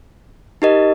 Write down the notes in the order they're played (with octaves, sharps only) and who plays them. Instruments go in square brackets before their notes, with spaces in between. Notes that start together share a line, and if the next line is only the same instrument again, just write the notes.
[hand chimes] D#4 G4 A#4 D#5